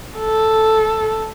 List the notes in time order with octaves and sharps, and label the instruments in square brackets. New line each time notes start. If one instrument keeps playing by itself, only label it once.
[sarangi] A4